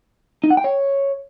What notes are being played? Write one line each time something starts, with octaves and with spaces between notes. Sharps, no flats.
D#4
F#5
G5
C#5